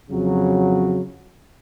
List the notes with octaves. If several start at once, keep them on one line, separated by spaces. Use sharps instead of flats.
F2 C#3 F#3